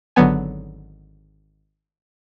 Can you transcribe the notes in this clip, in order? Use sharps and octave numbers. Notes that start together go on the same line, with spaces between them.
G#1 D3 F#3 B3 G#5